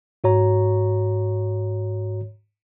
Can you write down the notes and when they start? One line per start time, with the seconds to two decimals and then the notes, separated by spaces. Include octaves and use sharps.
0.24 G#2 F#4 C#5 A#5